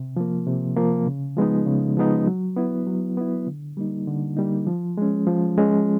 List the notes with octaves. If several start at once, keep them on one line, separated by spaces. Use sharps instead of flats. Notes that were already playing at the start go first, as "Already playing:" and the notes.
Already playing: C3
F3 A#3
C3
F3 A#3
C#3
F3 G#3 B3 D#4
C#3
F3 G#3 B3 D#4
F#3
B3 E4
F#3
B3 E4
D3
G3 A#3 D#4
D3
G3 A#3 D#4
F3
G#3 C#4
F3
G#3 C#4